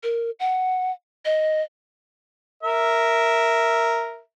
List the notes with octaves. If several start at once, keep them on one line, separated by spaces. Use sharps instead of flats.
A#4
F#5
D#5
A#4 E5